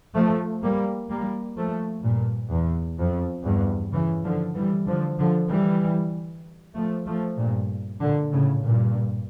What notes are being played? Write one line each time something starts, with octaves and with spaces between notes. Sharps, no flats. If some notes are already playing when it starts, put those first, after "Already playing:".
F3 A3
G3 A#3
G3 A#3
F3 A3
G2 A#2
E2
F2
E2 G2
C#3 E3
D3 F3
E3 G3
D3 F3
D3 F3
E3 G3
F3 A3
F3 A3
G2 A#2
A#2 D3
A2 C#3
G2 A#2